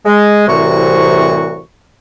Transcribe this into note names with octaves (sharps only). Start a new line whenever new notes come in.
G#3
C2 A2 C3 E3 F#4 C#6